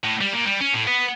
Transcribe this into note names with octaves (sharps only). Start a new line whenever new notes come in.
A2
G3
A#2
G3
C#4
A2
B3